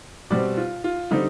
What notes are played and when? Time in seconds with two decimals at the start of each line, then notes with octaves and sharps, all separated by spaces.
0.30 B2 G3 C4 D5
0.57 F4
0.84 F4
1.11 D3 G3 C4 D#4